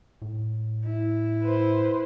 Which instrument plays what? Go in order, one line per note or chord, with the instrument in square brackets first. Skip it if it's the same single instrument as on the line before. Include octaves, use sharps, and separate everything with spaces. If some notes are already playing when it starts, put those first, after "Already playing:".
[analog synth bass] A2
[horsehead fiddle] E4
[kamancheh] B4 C5